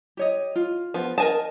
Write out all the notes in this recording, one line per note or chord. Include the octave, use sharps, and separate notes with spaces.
G4 C#5 D#5
F4
F3 B3
A#4 D#5 G#5 A5